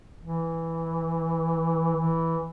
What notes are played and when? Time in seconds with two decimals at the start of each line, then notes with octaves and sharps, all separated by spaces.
0.21 E3
1.97 E3